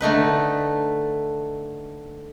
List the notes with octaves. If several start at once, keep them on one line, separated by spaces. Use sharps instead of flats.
D3 A3 D#4 B4